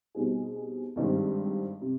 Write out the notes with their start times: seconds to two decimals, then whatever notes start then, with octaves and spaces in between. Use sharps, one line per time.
0.15 B2 G3 C4 D#4 G#4
0.96 G#1 G2 D#3 G3 C4
1.81 C3